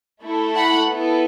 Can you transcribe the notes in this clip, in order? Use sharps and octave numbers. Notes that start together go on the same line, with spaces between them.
A3 E4 A4
F#5 B5
B3 E4 A4